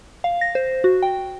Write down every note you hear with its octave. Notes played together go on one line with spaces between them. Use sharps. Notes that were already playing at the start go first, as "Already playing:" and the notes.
F5
A#6
C5
F#4
G5